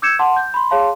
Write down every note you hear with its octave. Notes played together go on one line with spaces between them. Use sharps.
D6 E6 G6 G#6 C#7 E7
F#5 A5 C6 D6
G6
B5 C6
G#4 C#5 F5 A5 C6